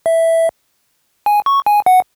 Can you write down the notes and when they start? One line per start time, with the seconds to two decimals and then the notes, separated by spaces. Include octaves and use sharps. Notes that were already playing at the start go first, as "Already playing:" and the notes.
0.06 E5
1.26 G#5
1.46 C#6
1.66 G#5
1.86 F#5